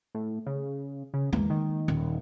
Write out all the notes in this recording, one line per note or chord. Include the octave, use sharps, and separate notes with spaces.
A2
C#3
C#3
E2 G#3 A#3
D#3
D#1